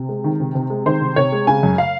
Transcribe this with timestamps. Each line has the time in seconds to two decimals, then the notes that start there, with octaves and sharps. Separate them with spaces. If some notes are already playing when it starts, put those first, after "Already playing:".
Already playing: C3
0.09 G#3
0.24 D#3
0.40 C3
0.55 C3
0.70 G#3
0.86 D#3 C5
1.01 C3
1.16 C3 C#5
1.32 G#3
1.47 C#3 G#5
1.63 F#2
1.78 F5